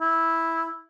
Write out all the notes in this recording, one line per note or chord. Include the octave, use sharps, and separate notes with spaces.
E4